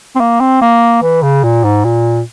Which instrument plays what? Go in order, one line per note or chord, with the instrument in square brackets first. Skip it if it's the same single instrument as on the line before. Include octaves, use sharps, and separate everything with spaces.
[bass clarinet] C4
A#3
C4
A#3
E3
C#3
A#2
G#2
A#2